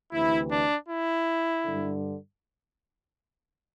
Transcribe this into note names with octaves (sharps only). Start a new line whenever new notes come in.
D2 C3 E3 E4
D4
E4
G2 D3